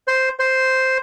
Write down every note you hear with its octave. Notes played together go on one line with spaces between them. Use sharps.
C5
C5